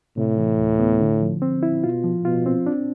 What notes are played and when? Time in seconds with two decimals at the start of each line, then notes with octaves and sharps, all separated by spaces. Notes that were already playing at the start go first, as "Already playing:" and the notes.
0.17 A2 C3
0.38 E3
0.59 D2
0.79 B3
1.01 D3
1.21 F3
1.42 C4
1.63 E4
1.84 B2 F4
2.04 F3
2.25 B2 F4
2.46 C4
2.66 D4